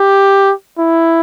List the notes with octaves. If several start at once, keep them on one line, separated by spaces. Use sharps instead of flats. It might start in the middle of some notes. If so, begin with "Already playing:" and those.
Already playing: G4
E4